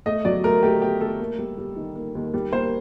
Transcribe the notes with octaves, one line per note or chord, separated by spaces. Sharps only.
A3 D#5
F#3 D5
A3 A#4
A3 G4
A3 G4
A3 A4
A#3
G3
G3
D#3
A#3
D#2
G3
A#3 C5